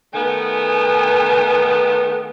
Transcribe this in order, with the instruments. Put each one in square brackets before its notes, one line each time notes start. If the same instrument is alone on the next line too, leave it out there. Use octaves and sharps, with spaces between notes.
[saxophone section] D#3 A3 B3 [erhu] G#5